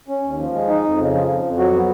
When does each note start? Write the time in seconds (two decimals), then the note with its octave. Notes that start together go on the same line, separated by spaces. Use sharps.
0.08 C#4
0.24 D#2
0.39 F3
0.53 G#3
0.68 D#4
0.83 F2
0.98 C#3
1.13 F3
1.27 F2
1.42 F2
1.57 F#3 F#4
1.73 B3